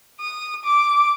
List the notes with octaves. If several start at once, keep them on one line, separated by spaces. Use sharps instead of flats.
D#6
D6